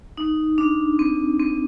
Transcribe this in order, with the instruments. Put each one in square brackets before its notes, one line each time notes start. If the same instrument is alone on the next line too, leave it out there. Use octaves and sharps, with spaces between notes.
[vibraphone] D#4
D4
C4
C4